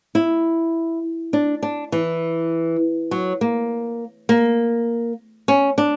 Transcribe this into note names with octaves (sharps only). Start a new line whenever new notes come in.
E4
D4
D4
E3
F#3
A#3
A#3
C#4
D4